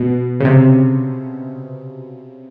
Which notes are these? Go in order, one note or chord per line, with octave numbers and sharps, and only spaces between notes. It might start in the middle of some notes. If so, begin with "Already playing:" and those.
Already playing: B2
C#3
C3